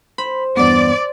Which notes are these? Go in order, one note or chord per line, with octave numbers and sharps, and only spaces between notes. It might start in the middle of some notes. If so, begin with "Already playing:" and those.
C5 B5
E2 G2 B3 D5